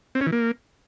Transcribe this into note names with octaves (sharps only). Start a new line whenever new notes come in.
C4
C#4
E3
A#3